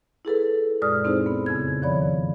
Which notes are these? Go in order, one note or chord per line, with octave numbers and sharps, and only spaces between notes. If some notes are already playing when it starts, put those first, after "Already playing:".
E4 G#4 A4 B4
F#2 A#2 G#3 D5 D#6 F6
C4 D#4 E4 G#4 C5
B3
F2 C#3 G#6
D#3 F3 C#5 D5 B5